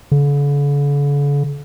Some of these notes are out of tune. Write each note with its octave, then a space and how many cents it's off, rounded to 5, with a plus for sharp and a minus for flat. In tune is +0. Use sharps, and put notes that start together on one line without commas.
D3 -45